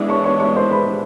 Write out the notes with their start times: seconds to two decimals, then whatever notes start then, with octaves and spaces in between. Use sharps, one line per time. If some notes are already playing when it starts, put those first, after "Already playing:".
Already playing: E3 G#3 B3 D4
0.09 C#5 C#6
0.24 C#5 C#6
0.40 C#5 C#6
0.56 C5 C6
0.71 B4 B5